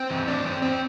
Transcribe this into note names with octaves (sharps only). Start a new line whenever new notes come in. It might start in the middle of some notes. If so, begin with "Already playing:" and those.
Already playing: C4 C5
E3
A2 D4 D5
E3 C4 C5
E2 C4 C5